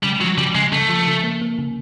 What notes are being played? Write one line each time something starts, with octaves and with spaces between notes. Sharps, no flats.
C#3 G3
F3 F#3
C#3 G3
C#3 G#3
C#3 A3
F3
C#3
A#3
A#3
C#3